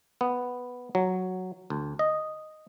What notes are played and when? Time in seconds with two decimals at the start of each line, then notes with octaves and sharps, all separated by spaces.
0.21 B3
0.95 F#3
1.70 D2
1.99 D#5